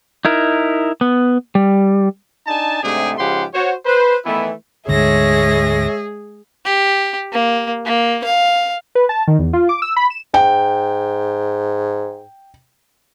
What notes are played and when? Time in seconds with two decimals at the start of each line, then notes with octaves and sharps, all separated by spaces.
0.25 D#4 E4 A#4
1.01 B3
1.55 G3
2.47 D4 D#4 G#5 A5
2.83 G#2 C3 A3 D4 G4 G#4
3.18 G#2 C#3 F3 G4 F#5 C6
3.54 F#4 C5 C#5
3.85 B4 C5
4.25 D#3 E3 A3 B3 E4
4.89 D2 G#2 D3 G#3 G#4 C#5 E5 A#6
6.65 G4
7.32 A#3
7.85 A#3
8.24 F5
8.95 B4
9.09 A5
9.28 D#3
9.39 E2
9.53 F4
9.69 D6
9.82 E6
9.96 B5
10.10 E7
10.34 G#2 G5